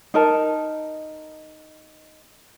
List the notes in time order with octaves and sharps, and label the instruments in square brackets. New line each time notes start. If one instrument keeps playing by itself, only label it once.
[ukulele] D#4 A#4 A5